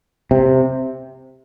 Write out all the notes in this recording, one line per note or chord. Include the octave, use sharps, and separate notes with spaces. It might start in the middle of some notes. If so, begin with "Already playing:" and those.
C3